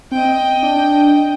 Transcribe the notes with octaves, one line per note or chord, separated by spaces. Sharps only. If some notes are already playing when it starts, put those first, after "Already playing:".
C4 D#5 G5
D4